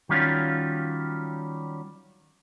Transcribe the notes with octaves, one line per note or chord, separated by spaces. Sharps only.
D#3 F#3 G3 C#4 F4